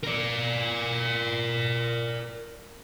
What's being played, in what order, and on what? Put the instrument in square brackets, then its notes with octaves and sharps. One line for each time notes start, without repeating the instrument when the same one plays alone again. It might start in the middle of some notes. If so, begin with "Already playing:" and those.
[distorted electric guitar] A#4 D5